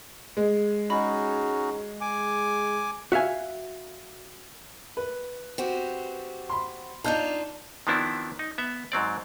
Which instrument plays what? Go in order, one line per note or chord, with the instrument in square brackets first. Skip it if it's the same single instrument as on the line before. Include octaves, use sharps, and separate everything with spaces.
[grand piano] G#3
[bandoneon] C#4 D#4 F#4 [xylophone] D#5 B5
[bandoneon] G#5 D6
[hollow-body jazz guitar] F#4 E5 F5 G#5
[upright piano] B4
[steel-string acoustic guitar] C4 F#4 G4
[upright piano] B5 C6
[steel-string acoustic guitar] D4 D#4 F4 [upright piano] A5 G6
[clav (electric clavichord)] D#3 F3 B3 C4 D4 E4
D#4
B3 E5
G#2 F#3 C4 D5